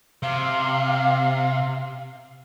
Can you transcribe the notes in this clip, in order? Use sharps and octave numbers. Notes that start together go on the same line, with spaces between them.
C3 F5